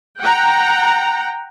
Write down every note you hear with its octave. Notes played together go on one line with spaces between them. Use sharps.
F#5 G5 A#5